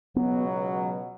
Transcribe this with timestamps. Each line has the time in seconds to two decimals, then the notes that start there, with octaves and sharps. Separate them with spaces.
0.16 C#2 B2 F#3 B3